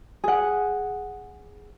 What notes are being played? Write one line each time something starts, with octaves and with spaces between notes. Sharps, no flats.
G#4 F#5